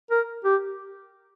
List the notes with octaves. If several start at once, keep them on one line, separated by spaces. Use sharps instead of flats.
A#4
G4